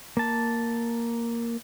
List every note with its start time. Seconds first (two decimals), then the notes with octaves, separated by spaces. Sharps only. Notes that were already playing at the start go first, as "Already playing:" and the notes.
0.17 A#3 A5